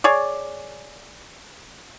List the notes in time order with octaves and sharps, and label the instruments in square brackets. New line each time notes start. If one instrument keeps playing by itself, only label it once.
[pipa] G#4 C#5 D5